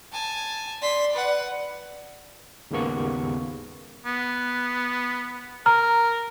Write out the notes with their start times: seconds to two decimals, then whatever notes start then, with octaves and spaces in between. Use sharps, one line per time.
0.13 G#5 A5
0.82 D5 C6 B6
1.13 B4 F#5
2.71 D#2 G#2 C#3 A#3 B3 C#6
4.06 B3
5.66 A#4 A#5 F6